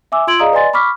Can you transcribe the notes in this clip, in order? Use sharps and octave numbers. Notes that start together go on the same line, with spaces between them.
E5 G#5 D6 E6
F4 C6 E6 G#6 D7 F#7
G#4 D5 D#5 F5 A#5 D#6
B4 D5 D#5 G#5 C6 A6
B5 C#6 D6 F6 B6